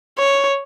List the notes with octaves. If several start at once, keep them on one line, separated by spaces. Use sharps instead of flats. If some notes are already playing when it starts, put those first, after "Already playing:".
C#5